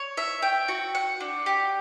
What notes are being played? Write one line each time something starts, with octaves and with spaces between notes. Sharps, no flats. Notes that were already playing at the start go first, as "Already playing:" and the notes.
Already playing: C#5
E5
G5
F#4
F#5
D4
G4